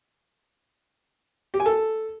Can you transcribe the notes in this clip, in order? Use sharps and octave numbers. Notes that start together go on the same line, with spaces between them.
G4
G#5
A4